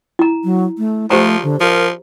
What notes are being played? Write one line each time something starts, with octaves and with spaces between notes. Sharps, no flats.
E4 A#5
F#3
A3
F3 A3 G4 C5 A#5
D3
F3 A#4